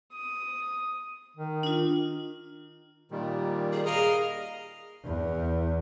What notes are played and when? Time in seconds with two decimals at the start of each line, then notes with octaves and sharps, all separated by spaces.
0.12 D#6
1.37 D#3
1.63 D4 F4
3.11 A#2 D#3 G3
3.73 G#4
3.86 G#4 A#4 D#5 F5
5.04 E2